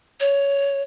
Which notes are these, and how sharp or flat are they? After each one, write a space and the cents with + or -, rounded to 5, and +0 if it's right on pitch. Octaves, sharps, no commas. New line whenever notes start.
C#5 +10